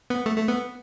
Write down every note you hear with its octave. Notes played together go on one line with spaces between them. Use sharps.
B3
A3
A3
B3